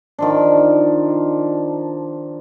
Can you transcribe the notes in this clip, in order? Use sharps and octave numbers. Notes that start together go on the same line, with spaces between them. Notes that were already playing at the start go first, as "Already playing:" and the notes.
D#3 F3 D4